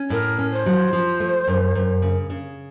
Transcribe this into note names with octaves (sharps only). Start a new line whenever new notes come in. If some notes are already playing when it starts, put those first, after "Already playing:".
Already playing: C#4
A2 A#4
C#4
C5
F#3
F3
A3
F#2
F#2
C#3
C#3